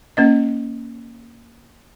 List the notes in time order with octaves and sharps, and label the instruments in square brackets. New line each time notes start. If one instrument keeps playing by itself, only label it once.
[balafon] A#3 C#4 D#5